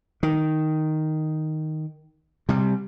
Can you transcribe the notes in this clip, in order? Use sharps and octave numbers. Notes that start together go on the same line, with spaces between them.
D#3
C3 G3